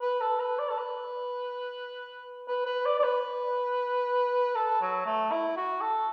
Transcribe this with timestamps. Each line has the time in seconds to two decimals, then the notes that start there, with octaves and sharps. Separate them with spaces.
0.02 B4
0.21 A4
0.40 B4
0.59 D5
0.70 A4
0.78 B4
2.48 B4
2.66 B4
2.86 D5
3.00 D5
3.04 B4
4.56 A4
4.82 F#3
5.06 A3
5.32 E4
5.57 F#4
5.81 A4